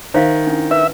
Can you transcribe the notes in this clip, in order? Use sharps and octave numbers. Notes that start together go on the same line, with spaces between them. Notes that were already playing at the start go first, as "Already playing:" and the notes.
D#3 C5 E5 F5
C#4 D4 E4
B4 E5